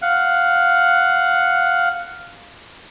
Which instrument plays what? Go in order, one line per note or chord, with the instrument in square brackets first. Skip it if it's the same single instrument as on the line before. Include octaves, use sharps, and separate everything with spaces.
[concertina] F5 F#5